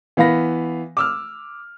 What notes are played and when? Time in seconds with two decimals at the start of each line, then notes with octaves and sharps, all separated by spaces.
0.17 E3 B3 F5 B5 A#6
0.97 D6 E6 F6